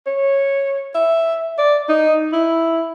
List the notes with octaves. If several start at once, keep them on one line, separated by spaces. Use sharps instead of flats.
C#5
E5
D5
D#4
E4